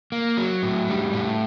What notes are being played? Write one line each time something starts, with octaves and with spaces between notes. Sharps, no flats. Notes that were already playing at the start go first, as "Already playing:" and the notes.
A#3
F#3
A2
G3
A2